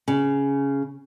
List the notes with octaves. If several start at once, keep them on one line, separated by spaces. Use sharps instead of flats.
C#3